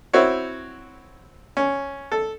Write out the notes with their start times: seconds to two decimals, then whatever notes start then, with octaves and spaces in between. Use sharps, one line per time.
0.13 C4 E4 F#4 C#5
1.57 C#4
2.12 A4